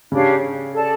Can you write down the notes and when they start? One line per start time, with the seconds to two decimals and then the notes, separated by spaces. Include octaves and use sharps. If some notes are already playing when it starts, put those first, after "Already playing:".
0.12 C#3 D4 G4 C#5 F5
0.72 A4 D5 A5